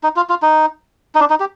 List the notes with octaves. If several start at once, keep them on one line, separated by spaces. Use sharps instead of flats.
D#4
F4
F4
D#4
D#4
D4
D#4
G4